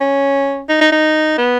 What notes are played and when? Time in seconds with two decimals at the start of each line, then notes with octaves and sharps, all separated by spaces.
0.01 C#4
0.69 D#4
0.81 D#4
0.92 D#4
1.38 B3